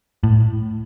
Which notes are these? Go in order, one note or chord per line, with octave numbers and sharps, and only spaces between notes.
A2